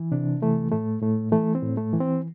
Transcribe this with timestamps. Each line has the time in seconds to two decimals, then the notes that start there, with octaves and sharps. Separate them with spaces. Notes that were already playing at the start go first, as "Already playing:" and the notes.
Already playing: E3
0.12 C3 D4
0.42 E3 A3
0.71 A2 A3
1.02 A2 A3
1.32 E3 A3
1.55 C4
1.62 A2
1.77 A3
1.93 E3
2.00 C4